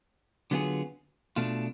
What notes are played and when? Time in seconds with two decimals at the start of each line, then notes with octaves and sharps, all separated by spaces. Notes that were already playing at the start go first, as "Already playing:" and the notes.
0.51 D3 F#3 B3 F4 G#4
1.36 B2 A3 D4 F4